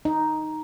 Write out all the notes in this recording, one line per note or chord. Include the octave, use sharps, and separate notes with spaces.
D#4